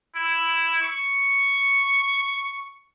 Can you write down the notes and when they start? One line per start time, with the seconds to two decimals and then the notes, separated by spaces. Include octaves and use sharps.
0.15 E4
0.82 C#6